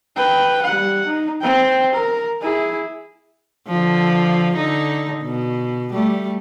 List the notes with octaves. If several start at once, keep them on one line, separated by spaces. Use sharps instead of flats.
B4 G5
G3 F#5
D#4
C4 G5
A#4
E4 G#4
D3 F3
D3 D#4
B2
G3 A3